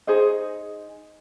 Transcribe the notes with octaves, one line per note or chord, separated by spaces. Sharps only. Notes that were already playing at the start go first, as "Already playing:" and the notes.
D#4 G#4 C5 D#5